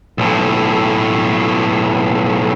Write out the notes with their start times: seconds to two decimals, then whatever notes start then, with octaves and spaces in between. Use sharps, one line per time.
0.18 B1 A2